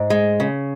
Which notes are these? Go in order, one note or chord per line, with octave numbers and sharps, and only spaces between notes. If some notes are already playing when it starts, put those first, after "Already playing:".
Already playing: G#2
G#3
C#3